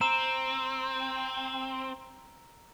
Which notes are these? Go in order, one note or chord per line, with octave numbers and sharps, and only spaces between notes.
C4 A#5 E6 E7